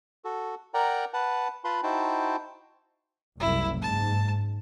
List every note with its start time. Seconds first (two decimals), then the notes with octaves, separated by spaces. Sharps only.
0.25 F#4 A4
0.74 A#4 D5 F#5 G5 A#5
1.14 B4 F#5 A5
1.64 F4 B4 A5 B5 C6
1.83 D#4 E4 F#4 C5 G5 A5
3.40 F#1 C2 E4
3.82 G#2 A5